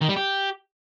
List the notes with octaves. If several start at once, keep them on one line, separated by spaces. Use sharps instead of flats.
D#3
G3
G4